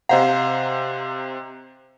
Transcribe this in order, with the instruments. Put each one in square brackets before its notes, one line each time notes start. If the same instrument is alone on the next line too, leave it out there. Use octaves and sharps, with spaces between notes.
[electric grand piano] C3 C5 A#5 [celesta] D#5 F5 [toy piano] F#5